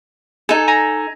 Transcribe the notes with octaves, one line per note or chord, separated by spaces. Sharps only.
D#4 A4 G#5
G#5 A#5